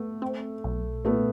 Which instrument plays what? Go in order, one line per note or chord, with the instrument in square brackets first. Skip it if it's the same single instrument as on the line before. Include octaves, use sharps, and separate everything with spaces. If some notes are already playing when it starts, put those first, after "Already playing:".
Already playing: [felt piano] A3 [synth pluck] B3
[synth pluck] C4
B1
[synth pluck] A#2 [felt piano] A3 B3